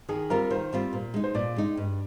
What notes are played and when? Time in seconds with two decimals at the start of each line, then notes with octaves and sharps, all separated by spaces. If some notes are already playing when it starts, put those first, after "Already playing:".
0.09 D#3 G#4
0.30 G3 C4 F4 A#4
0.50 D#3 C5
0.73 G3 C4 F4
0.93 A#2
1.14 G#3 D#4
1.24 C5
1.35 A#2 D5
1.56 G#3 D#4
1.77 G2